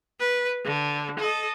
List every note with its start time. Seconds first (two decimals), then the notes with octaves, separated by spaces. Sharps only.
0.20 B4
0.65 D3
1.19 A4 D#5